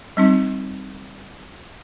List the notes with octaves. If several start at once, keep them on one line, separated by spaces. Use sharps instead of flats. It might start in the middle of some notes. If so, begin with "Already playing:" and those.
G3 C4 D#4